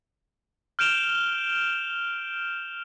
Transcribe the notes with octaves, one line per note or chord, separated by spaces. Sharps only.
F6 G6 D7 E7 F7 G7